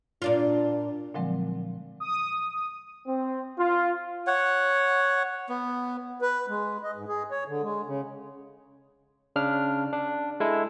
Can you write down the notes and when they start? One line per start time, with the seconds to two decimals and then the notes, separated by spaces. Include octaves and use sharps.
0.22 A#2 D4 F4
1.14 A#2 D3 F3 F#3 G#3 C4
2.00 D#6
3.06 C4
3.58 F4
4.27 C#5 F#5
5.49 B3
6.22 B4
6.48 G#3
6.83 D#5
6.96 G#2
7.08 G#4
7.31 C#5
7.47 D3
7.62 G#3
7.86 C#3
9.36 C#3 D4 F6
9.93 D4
10.40 G#3 E4 A4